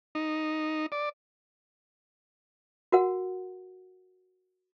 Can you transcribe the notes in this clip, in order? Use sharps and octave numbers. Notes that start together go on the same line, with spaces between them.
D#4
D5
F#4 A#4 F#5